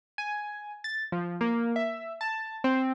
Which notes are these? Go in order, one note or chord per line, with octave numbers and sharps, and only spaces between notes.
G#5
A6
F3
A#3
E5
A5
C4